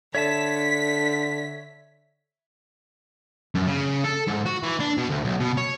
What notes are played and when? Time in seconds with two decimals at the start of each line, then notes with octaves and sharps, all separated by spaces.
0.15 D3 C#5 E5 A5 B6
3.55 F#2
3.67 C#3
4.04 A4
4.27 G#2
4.45 F#4
4.63 E3
4.80 D4
4.97 B2
5.09 D2
5.24 B1
5.40 B2
5.57 C#5